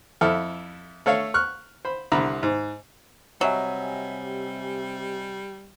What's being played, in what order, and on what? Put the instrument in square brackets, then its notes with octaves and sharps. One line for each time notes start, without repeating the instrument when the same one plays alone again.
[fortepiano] F2 E4 A4 F6
A3 A4 C#5 F5
C#6 F6 F#6
C5 B5
C2 D3 A#5 B5
G#2
[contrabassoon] C3 [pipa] F#3 [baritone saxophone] G3 [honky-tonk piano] D#5 E5 G#5